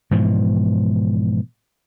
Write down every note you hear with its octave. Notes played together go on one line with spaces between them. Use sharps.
G#2 B2 E3 F3